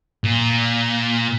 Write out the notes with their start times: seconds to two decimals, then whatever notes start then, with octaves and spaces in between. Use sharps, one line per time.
0.24 A#2